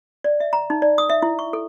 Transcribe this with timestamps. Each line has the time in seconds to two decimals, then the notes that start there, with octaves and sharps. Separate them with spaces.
0.24 D5
0.40 E5
0.53 A#5
0.70 D#4
0.82 D5
0.98 D#6
1.10 E5
1.22 E4
1.39 C#6
1.53 A4